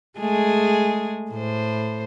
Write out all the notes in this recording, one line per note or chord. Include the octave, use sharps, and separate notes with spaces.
G#3 A3 G#4
A2 C5